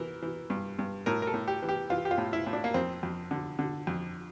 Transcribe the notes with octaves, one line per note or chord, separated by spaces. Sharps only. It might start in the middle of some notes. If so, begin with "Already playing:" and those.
Already playing: E3 A#4
E3
G2
G2
A2 A#4
A#4
A4
A2
G4
E3
G4
E3 F4
G4
F4
A2
E4
A2
D4
A#3
F2 C4
F2
D3
D3
F2